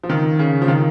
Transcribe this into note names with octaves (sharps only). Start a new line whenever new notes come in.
F3
D#3
C#3
F3
D#3